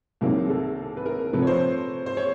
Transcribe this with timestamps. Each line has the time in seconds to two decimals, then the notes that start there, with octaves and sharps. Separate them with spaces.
0.21 C2 C3 D#3 F#3 A#3 G#4
0.49 A4
0.97 B4
1.06 A#4
1.33 C3 F3 A3 B4
1.42 C#5
1.47 C5
2.06 C5
2.17 C#5